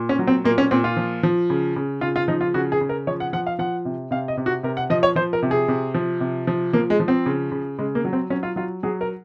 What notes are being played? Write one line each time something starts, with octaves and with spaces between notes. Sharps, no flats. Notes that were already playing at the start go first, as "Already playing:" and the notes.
Already playing: A#2
C#4
F#3
C4
A#2 A#3
C#4
A#2 C4
F4
F3
F3
C#3
C#3
C#3 F4
F4
F3 D#4
F4
C#3 F#4
G#4
C#3
A#4
F3 C#5
F#5
F3 F#5
F5
F3 F#5
C3
C3 F5
D#5
C3
F#4
C3 A#4
F#5
F3 D#5
C#5
F3 C5
A#4
C3
G#4
C3
F3
C3
F3
F3 A#3
G#3
F3
C4
C#3
C#3
C#3 G#3
A#3
F#3
C4
F#3 C#4
F4
F#3 F4
F#3 G#4
A#4